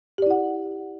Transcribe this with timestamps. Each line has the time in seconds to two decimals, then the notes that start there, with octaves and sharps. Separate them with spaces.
0.18 G4
0.22 D5
0.26 E4
0.30 F#5